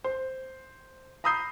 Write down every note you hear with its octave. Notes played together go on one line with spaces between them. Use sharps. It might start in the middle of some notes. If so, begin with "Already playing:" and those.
C5
A#5 B5 D#6 E6 G6 C7